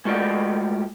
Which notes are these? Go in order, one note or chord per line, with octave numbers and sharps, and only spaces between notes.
G#3 A3 F4 F#4 D5 D#5